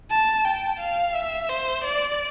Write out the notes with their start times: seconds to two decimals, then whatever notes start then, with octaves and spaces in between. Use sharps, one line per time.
0.10 A5
0.45 G5
0.80 F5
1.15 E5
1.49 C5
1.84 D5